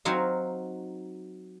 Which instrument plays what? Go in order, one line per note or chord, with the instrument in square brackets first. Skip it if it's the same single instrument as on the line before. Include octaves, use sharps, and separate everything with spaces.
[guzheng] F#3 C4 D#4 F#4 F5